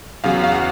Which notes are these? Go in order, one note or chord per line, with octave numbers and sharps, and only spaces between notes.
E2 C#3 F#3 F5
F5
F#5